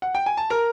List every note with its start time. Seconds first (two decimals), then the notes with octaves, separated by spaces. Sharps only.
0.02 F#5
0.15 G5
0.26 G#5
0.37 A5
0.50 A#4 A#5